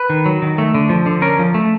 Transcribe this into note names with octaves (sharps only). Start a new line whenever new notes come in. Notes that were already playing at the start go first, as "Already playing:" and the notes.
Already playing: B4
D#3
F#3
D#3
A3
D3
F3
D3
C#4 A#4
F3
A3